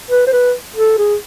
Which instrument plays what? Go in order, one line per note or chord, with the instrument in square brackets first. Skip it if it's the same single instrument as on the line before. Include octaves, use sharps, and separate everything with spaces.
[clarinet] B4
C5
B4
A4
G#4